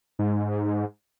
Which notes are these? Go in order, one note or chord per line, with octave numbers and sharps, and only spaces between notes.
G#2